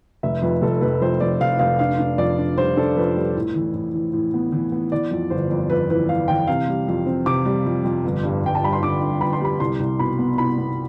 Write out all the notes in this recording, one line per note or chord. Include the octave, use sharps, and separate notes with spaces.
F1 E5
F2 B4
F1 A4
F1 B4
F2 C5
F2 D5
F1 F5
F1 F5
D4 F5
D4
F2 D5
D4
G3 C5
D4 A4
F2 B4
G3
A2
E3
A2
E3
A2
B3
E3
B3
E3 D5
F2
G1 C5
F2
F2 B4
E3 B4
E3 F5
E3 G5
C3 F5
G3
F2
C4
C3 D6
G3
F2
F2
G1
G2
G1 G5
A5
G2 B5
C6
D3 D6
G2
G1 B5
C6
G3 B5
C2 C6
C2
B2 B5
B3
C2 B5
B3